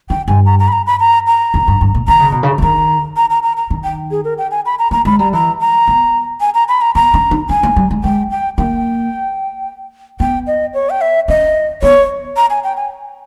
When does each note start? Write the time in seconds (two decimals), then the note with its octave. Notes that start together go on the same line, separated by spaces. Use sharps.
0.10 D#3 G5
0.28 G2 G#5
0.46 A#5
0.59 A#5
0.68 B5
0.72 A#5
0.86 B5
1.00 A#5
1.27 A#5
1.54 E2
1.68 G2
1.81 G2
1.95 A#2
2.08 D#3 A#5
2.20 C#3
2.32 B2
2.43 C#3
2.58 E3
2.62 D#3 A#5
3.17 A#5
3.30 A#5
3.43 A#5
3.57 A#5
3.70 D#3
3.84 G5
4.11 G#4
4.24 A#4
4.38 G5
4.51 G#5
4.66 B5
4.79 A#5
4.91 A#3 A#5
5.05 G#3 B5
5.19 G3 A#5
5.33 E3 A#5
5.60 A#5
5.88 B3
6.41 G#5
6.55 A#5
6.69 B5
6.81 A#5
6.95 B3 A#5
7.14 C#4
7.31 D#4
7.49 C#4 G#5
7.63 A#3
7.76 G3
7.91 G#3
8.04 G#3 G5
8.31 G5
8.58 A#3 G5
10.20 B3 G5
10.47 D#5
10.74 C#5
10.90 G5
11.01 E5
11.28 C#4 D#5
11.82 B3 C#5
12.37 A#5
12.50 G#5
12.64 G5
12.77 G#5